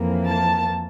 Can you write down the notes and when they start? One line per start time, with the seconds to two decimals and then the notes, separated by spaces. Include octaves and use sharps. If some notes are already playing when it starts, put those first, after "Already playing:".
Already playing: F2 E3 A#3
0.27 A5